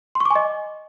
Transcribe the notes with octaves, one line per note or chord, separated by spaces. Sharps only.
C6
C#6
D6
G#5
D#5